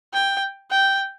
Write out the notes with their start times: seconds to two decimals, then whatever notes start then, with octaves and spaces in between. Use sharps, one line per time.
0.13 G5
0.71 G5